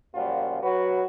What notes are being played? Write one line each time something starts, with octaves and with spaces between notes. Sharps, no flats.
F#2 A#2 F3 G3 F4 F#4
F#3 F#4 B4